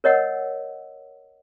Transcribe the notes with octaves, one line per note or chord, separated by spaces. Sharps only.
A#4 C#5 D#5 F#5 E6